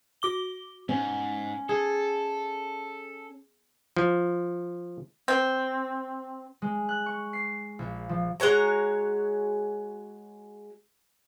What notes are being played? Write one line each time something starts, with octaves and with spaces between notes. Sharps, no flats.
F#4 D6 G7
G#2 C#4
G#4 A4
F3
C4
G#3
F#6
C#6
C7
A#1
F3
G#3 F#4 C#5 A#5